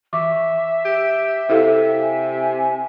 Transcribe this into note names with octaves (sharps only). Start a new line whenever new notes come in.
E3 E5 C#6 D6
G4
C3 E4 A4 F5
G#5